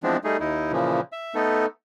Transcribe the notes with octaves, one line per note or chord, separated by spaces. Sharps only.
E3 F3 G#3 B3 C4 D4
G3 A3 D#4 G#4
D#2 D#4 E4
A#2 C#3 E3 F3
E5
A3 B3 D#4 A4